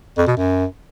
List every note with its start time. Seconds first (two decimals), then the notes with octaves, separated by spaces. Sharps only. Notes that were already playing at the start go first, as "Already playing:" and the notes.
0.17 F2
0.27 B2
0.37 F#2